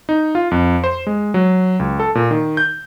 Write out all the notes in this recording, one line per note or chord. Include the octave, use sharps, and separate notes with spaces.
D#4
F4
F2
C5
G#3
F#3
C#2
A4
A#2
D#3
G6